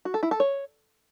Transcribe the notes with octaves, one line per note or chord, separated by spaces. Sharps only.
F#4
A4
E4
A4
C#5